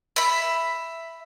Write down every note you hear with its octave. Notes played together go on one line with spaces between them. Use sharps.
E5 B5